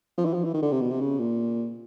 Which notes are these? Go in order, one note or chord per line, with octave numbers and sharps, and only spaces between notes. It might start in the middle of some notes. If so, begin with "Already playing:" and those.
F3
E3
F3
E3
D#3
D3
C3
B2
C3
C#3
A#2